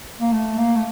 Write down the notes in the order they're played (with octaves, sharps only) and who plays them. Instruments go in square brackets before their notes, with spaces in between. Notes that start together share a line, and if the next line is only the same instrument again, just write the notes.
[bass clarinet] A#3
A3
A#3
A3